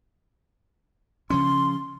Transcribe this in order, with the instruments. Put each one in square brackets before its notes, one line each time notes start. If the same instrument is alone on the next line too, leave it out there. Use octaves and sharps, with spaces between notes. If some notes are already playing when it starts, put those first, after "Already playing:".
[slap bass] C#3 F3 C#4 [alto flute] C6